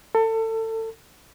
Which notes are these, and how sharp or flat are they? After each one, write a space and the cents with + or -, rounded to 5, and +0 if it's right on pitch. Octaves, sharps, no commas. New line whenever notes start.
A4 +25